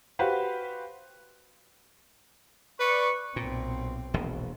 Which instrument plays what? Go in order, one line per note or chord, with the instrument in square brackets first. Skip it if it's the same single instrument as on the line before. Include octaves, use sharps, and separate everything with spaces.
[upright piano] F#4 G4 B4 C5 F5
[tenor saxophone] B4 [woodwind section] D5 C#6
[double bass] B1 C4 [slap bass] A#2
[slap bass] E1 A#1 B2